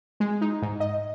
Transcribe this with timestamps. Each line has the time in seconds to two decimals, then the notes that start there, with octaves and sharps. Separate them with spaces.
0.20 G#3
0.41 D#4
0.62 G#2
0.80 D#5